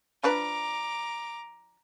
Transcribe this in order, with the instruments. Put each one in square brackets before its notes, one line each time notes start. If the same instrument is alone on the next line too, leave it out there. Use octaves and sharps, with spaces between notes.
[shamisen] F3 D4 B4 [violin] A#5 D6